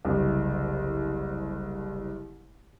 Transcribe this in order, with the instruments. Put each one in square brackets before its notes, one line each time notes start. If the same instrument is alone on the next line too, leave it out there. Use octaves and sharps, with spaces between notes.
[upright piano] F#1 C2